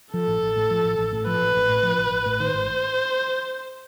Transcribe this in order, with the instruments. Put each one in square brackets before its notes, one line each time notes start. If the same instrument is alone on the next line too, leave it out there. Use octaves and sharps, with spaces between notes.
[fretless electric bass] F3 [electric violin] A4
[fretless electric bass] A1
A1
A2
F3
A1
A1
A2
[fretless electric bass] F3 [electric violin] B4
[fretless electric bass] A1
A1
A2
F3
A1
A1
A2
[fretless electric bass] D#3 [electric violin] C5
[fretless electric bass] G#1